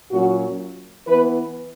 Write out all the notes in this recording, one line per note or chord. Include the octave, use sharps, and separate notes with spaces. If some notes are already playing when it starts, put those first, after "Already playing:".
A#2 F#3 C#4 F#4
E3 B3 B4